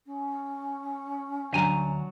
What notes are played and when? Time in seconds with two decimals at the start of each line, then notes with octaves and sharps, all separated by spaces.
0.06 C#4
1.53 D2 F#3 D4 G#5 A#5